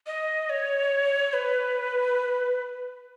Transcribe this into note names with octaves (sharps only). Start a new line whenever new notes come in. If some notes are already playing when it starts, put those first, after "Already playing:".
D#5
C#5
B4